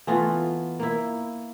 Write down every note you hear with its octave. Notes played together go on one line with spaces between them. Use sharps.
E3 A3 B3 F4
A#3 E4